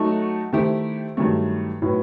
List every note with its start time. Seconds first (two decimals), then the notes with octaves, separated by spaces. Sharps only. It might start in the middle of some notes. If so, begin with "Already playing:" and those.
Already playing: F#3 A3 D#4 F#4 A4
0.53 D#3 A3 E4 G4 C5
1.17 G2 D#3 F#3 A3
1.82 A2 F#3 B3